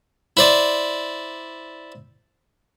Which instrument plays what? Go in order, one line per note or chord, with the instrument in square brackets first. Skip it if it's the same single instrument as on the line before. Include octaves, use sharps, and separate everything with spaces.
[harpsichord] E4 C5 D5